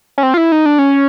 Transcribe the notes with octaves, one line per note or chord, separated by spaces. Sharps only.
C#4
C4
F4
E4
D#4
D4
C#4